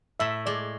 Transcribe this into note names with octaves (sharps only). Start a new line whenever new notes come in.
A2 E5
G#3 D5